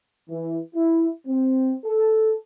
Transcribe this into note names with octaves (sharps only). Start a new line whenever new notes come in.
E3
E4
C4
A4